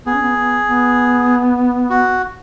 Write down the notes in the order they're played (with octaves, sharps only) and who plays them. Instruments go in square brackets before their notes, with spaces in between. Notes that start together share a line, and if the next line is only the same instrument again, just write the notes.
[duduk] B3 [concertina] G#4
[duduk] C#4
B3
B3
B3
[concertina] F#4